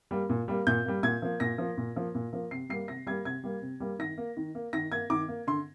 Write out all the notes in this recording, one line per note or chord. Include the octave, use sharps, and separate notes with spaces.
G3 A#3
A#2
G3 A#3
A#2 G6
G3 A#3
A#2 G#6
F3 A#3
A#2 A#6
F3 A#3
A#2
F3 A#3
A#2
F3 A#3
C3 C7
G3 A#3 C7
C3 A#6
G3 A#3 G#6
C3 G#6
G3 A#3
C3
G3 A#3
D#3 A#6
A#3
D#3
A#3
D#3 A#6
A#3 G#6
D#3 D6
A#3
D3 C6